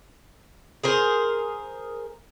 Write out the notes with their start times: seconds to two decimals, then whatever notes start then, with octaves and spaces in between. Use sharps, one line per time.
0.84 G#4 A#4 C5